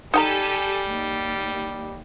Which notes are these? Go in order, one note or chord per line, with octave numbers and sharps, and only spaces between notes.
G3 D#4 G4 A4 G5 G#5 A#5
D#2